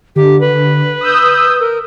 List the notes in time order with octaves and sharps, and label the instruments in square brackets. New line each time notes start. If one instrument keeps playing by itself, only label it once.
[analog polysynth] D3 [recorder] G4
[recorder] B4
[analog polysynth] D#6 E6 G6
[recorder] A#4